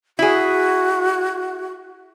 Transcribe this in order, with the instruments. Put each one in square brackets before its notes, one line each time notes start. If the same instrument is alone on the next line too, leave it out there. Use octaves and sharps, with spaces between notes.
[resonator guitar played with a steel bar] E4 G#4 [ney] F#4